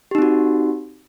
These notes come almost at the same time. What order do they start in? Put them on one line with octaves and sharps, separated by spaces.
G4 D#4 C4 F#4